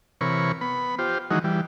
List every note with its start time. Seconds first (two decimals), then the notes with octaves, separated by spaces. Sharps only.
0.21 C3 E3 A#4 C#5 B5 C#6
0.61 B3 B5
0.99 F4 G4 C5
1.31 D#3 E3 F#3 G#3 D#4 F#4
1.44 E3 G3